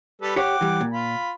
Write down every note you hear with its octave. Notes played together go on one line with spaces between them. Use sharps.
G3 A4 B4
G4 C#5 F#5 G5 D6
E3 G3
A#2
F4 B5